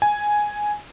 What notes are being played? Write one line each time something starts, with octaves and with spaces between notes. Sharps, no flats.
G#5